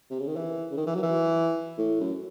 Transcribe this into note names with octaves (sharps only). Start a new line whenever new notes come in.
C3
C#3
D#3
E3
C#3
D#3
E3
F#3
E3
A2
F#2